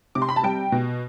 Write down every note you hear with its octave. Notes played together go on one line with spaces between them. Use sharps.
C3 D6
C6
B5
A5
G3 G5
B2